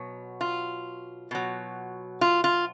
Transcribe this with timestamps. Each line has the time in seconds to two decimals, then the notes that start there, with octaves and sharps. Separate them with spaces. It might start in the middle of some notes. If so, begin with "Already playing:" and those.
Already playing: B2 F#3
0.41 F4
1.31 B2 F#3
2.21 F4
2.44 F4